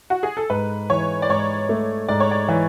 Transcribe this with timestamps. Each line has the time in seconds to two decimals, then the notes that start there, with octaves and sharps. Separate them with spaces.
0.10 F#4
0.23 G#4
0.37 A4
0.50 G#2 B4
0.90 E3 C#5
1.22 D5
1.29 G#2 C#5
1.69 A3
2.08 G#2 D5
2.20 C#5
2.31 D5
2.49 E3